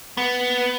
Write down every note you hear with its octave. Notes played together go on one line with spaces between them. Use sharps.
B3